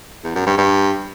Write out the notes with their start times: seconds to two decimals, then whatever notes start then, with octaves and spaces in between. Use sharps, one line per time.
0.24 E2
0.35 F#2
0.46 G2
0.57 G2